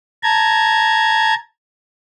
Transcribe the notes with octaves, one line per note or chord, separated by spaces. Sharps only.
A5 A#5 G#6